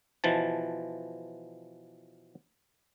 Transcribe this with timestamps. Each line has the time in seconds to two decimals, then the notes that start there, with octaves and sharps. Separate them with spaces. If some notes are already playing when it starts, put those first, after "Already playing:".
0.24 B2 E3 F3 A5